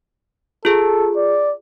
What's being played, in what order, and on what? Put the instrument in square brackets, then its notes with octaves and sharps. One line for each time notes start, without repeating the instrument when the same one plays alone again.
[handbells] F4 G#4 [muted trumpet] A4
[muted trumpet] D5